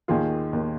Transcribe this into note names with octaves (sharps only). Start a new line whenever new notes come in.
D#2 D#3 F4 G#4
D#2 D#3